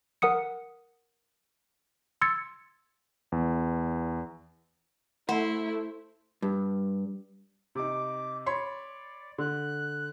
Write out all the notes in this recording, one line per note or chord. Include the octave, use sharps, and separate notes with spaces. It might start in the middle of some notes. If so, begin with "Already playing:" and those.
A#4 F#5 D#6 C#7
C6 E6 G#6 A6 C#7
E2
A3 E4 C5 F#5
G2
C3 D#4 D6
C#5 D5 B5 C6
D3 F#6